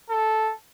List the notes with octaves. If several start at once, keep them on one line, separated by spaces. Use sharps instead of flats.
A4